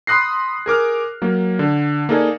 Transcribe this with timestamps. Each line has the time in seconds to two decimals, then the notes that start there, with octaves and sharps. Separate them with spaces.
0.07 B5 C6 D#6 F#6 A#6 C7
0.66 G#4 A#4 D6 F6
1.22 F#3 A#3
1.59 D3
2.09 A#3 D#4 G#4 A4 D5